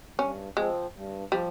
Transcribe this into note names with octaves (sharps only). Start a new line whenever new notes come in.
G2 C#4
F3 G#3 C4
G2
F3 G3